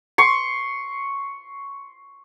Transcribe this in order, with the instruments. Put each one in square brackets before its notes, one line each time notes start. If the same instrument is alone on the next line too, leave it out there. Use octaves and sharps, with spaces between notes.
[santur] C6 C#6